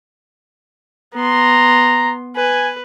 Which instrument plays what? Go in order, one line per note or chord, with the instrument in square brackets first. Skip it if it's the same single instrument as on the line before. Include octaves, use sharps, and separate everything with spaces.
[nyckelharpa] B3 C6 [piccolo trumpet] A#5
[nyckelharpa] B4 [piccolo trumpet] G#5